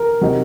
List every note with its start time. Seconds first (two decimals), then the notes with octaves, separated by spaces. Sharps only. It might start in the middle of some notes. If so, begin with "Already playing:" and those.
Already playing: A#4
0.21 C3 F#3 C4 D#4